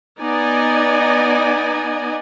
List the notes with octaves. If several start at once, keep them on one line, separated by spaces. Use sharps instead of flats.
B3 D#4 D5 D#5 G#5